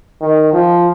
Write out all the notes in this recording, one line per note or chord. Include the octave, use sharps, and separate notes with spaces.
D#3
F3